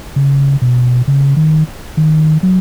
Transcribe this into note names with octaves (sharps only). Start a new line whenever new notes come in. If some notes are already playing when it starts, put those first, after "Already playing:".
C#3
B2
C#3
D#3
D#3
F#3